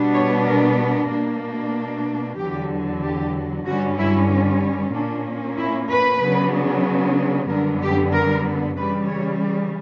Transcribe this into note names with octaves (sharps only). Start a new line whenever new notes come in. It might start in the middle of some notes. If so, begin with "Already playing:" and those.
Already playing: B2 G3 B3 D4
C#5
A#4
A#4
B2 A#3 D4
E2 D3 F#3 G4
G4
G2 D3 G3 C#4 F#4
E4
A#2 A#3 C#4 D4
E4
B4
C#3 F#3 B3 D4
F#2 D3 G3 B3 D4 A#4
G4
A#4
C#3 E3 G3 B4
C#5
D5